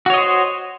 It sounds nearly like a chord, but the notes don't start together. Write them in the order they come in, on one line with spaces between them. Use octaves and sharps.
F#4 C#5 D#5 C5